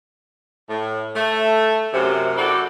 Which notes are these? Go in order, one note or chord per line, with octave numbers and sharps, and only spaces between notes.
A2
A3
F#2 C3
E4 F#4 G4 A4 D5